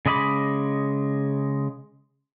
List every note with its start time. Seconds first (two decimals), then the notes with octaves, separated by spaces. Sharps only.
0.06 C#3 G#3 D#5 B5 D6